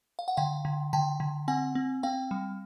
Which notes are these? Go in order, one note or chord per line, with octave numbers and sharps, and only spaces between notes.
F5
F#5
D3 F5 G5
D3
D3 G5 A5
D3
C4 F#5 G#5
C4
C4 F5 G5
G3